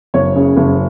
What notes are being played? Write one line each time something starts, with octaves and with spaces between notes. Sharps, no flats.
F#1 C#5
C#3
F#1